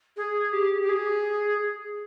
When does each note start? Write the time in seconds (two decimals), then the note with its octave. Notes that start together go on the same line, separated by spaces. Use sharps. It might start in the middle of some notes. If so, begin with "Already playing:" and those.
0.16 G#4
0.52 G4
0.81 G4
0.89 G#4